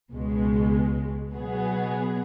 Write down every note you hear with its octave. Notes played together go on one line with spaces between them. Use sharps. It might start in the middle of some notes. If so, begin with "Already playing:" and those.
C#2 B2 G#3
B2 F#3 B3 G#4